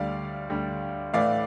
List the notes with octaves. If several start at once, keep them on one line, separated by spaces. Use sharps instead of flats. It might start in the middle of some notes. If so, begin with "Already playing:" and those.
Already playing: D2 D3 G3 D5 F5
D2 D3 G3
A2 E3 A3 D5 F5